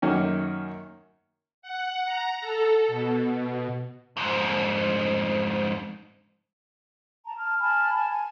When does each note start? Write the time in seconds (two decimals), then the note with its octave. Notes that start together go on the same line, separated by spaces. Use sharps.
0.02 F#2 D#3 A#3 C#4
1.62 F#5
2.05 A#5
2.41 A4
2.88 B2
3.25 B2
4.17 F2 G#2
7.25 A5 A#5
7.37 A5 F6
7.60 G#5 A5 B5 F6
7.94 G#5 A5
8.09 G#5